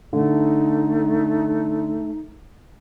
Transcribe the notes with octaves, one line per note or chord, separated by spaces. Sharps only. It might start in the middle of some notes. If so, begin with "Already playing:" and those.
D3 A3 D#4